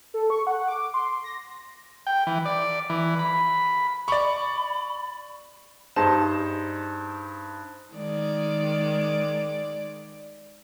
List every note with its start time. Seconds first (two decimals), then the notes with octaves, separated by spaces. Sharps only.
0.14 A4
0.30 C#6
0.47 F#5
0.68 D6
0.94 C6
1.24 A#6
2.07 G5
2.27 E3
2.45 D5
2.90 E3
3.19 B5
4.08 D5 B5 C#6
5.96 G2 D#4 G#4 C5 A5 E7
7.94 D#3 G#3 D5